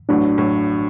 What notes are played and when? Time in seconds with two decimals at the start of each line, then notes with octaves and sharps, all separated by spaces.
0.09 A1 A2 F#3 D4
0.38 A2 F#3